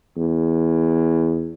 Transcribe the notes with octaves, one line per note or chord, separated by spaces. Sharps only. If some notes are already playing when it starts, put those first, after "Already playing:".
E2